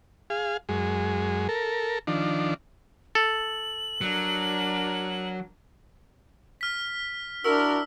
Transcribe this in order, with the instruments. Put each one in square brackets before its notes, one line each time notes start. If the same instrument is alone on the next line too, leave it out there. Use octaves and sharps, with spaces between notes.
[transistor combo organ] G#4 F5
F#2 G#3
A4 A#4
D#3 F3 D4
[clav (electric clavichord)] A4 [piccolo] F#7
[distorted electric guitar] F#3 [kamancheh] D4 A#4
[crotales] F6 B6
[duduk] D4 [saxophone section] E4 F#4 A#4 [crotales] E6